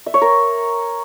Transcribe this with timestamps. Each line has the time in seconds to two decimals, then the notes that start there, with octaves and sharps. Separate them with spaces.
0.06 E5
0.14 C#5
0.22 A#4